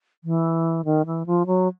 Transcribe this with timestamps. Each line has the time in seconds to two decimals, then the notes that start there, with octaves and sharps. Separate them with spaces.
0.24 E3
0.85 D#3
1.06 E3
1.26 F3
1.46 F#3